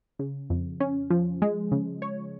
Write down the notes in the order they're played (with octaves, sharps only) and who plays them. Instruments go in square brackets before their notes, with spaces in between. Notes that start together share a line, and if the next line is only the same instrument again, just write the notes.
[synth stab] C#3
F2
C#4
F3
G#3
C#3
C#5